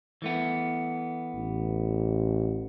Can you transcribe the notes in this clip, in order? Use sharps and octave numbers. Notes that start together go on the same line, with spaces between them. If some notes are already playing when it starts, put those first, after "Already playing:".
E3 A3 B3
A1